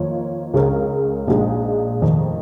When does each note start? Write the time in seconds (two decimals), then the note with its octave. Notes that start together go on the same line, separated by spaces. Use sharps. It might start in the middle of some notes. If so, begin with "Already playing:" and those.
Already playing: F2 D#3 A#3 F4 C#5
0.54 C#2 C#3 G#3 C#4 A#4
1.27 A#1 A#2 G#3 D#4
2.01 F1 F2 D#3